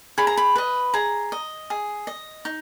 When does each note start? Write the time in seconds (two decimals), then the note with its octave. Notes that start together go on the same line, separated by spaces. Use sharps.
0.18 G#4 B5
0.27 A#5
0.37 B5
0.56 B4 D#5
0.94 G#4 A#5
1.32 D#5
1.70 G#4
2.07 D#5
2.45 D#4